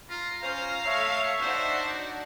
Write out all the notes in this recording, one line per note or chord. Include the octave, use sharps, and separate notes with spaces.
F4 A#5 A#6
C#4 F4 C5 F5
A3 C#5 E5
D4 D#4 F#4 C5 D5